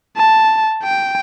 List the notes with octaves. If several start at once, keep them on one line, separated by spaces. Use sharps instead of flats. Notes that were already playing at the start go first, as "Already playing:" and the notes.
A5
G5